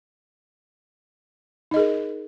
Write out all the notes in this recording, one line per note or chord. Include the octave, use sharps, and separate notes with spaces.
D#4 G#4 A#4 D#5